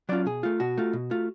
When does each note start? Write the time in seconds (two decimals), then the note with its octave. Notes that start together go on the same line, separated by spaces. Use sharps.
0.09 F#3 C#4 F4 D5
0.26 B2 G#4
0.43 A3 F4
0.60 B2 F#4
0.78 A3 F4
0.93 B2
1.11 A3 F4